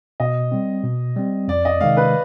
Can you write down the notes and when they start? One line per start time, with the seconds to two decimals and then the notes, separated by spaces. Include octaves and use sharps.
0.20 B2 D#5
0.52 G3 C4
0.83 B2
1.16 G3 C4
1.48 F2 D5
1.65 D#5
1.81 C3 D#3 G#3 F5
1.97 B4